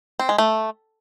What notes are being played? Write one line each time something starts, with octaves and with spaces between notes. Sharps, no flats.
C4
G#3
A3